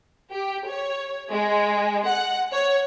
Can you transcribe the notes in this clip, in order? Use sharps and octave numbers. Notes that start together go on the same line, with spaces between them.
G4
C#5
G#3
F#5
C#5